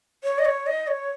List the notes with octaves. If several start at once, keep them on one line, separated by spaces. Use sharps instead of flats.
C#5
D#5
C#5
D#5
C#5